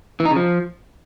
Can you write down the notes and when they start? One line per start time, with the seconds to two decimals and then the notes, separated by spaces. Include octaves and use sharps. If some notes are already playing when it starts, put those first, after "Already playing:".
0.20 E3
0.25 D#4
0.31 C#3
0.36 F3